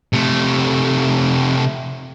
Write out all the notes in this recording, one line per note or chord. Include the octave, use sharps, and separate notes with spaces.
C3 A3